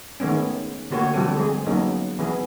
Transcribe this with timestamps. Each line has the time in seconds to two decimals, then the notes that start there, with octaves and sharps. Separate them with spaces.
0.20 D#3 G#3 A3 B3 C#4
0.91 D3 A3 A#3 F#4 G4 C#5
1.14 D3 F3 G3 C4 G4 A4
1.36 G#3 C4 G#4
1.66 F#3 G#3 A#3 B3 C#4 D#4
2.19 E3 B3 G#4